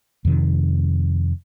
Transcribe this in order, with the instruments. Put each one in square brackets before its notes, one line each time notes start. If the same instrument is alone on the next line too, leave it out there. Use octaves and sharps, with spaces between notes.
[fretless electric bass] F2 C3 D#3